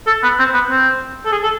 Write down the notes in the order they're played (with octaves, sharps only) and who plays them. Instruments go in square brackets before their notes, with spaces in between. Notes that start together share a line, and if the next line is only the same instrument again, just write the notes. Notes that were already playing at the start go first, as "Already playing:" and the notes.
[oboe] A4
B3
C4
B3
C4
A4
G#4
A4